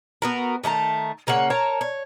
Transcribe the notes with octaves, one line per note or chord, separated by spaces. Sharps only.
B3 F#4 A#4
D#3 A3 A5 A#5
C#3 A#3 C#4 F#5
A#4 C#5 A5 A#5
C#5